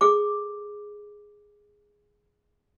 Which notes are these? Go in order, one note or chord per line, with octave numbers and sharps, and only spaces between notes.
G#4 A4 D6